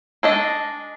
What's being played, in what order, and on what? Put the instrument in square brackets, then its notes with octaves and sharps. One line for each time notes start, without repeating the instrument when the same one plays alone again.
[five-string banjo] G#3 D4 D#5